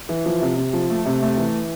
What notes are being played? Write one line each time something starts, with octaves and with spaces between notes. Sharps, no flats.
E3
F3
C3
C3
F3
A3
C3
A3
E3